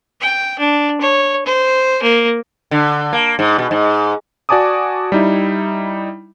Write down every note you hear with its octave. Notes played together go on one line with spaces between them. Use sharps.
G5
D4
C#5
C5
A#3
D3
A#3
G#2
B2
G#2
F#4 D5 G#5 A5 D6 D#6
G3 D#4 E4